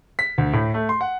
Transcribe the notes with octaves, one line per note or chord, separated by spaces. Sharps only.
B6
D2
A2
A3
C6
F#5